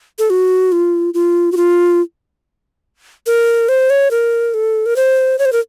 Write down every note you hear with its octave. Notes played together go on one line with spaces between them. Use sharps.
A4
F#4
F4
F4
F#4
F4
A#4
C5
C#5
A#4
A4
A#4
C5
C#5
C5
A#4